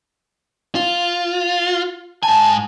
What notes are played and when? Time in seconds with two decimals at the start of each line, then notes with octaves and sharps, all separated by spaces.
0.75 F4
2.23 G#2 G#5 A5